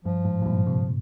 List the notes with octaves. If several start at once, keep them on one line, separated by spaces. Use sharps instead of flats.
G2 F3
G#2
G#2
G2 A#2
G#2 C3